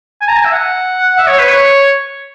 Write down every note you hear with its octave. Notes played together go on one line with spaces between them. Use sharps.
G#5
A#5
G#5
E5
F#5
E5
C#5
B4
C#5